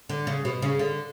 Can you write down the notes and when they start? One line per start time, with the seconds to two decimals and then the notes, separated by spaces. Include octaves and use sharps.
0.09 D3
0.27 C#3
0.45 B2
0.62 C#3
0.79 D3